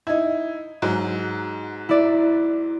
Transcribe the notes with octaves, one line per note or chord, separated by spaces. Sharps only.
D#4 E4 G#6
G#2 F#3
E4 D5